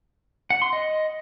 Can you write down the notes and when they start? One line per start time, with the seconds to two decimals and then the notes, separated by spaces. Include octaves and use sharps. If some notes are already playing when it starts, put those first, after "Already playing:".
0.50 F#5
0.62 C6
0.73 D#5